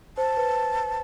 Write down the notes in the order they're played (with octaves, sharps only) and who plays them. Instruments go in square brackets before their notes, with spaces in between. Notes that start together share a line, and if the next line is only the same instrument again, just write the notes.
[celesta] C5 [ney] A5
[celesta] B4